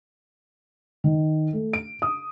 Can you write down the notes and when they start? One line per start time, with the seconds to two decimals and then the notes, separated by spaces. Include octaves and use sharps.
1.04 D#3
1.53 A3
1.73 D7
2.02 D#6